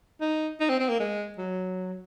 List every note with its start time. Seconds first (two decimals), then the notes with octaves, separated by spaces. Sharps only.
0.21 D#4
0.60 D#4
0.69 C4
0.80 C4
0.89 A#3
1.00 G#3
1.38 F#3